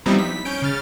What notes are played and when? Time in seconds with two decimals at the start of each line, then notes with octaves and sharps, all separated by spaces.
0.06 F3 G3 B3 C4 D#4 E4
0.18 B6
0.45 C#4 G6 D7
0.62 C#3 F6 A6